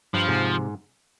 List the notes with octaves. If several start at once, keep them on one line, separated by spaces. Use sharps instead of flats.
G2 F3
G#2 C3